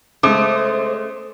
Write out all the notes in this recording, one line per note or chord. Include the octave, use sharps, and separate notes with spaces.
C#3 G#3 A3 C5 D6 D#6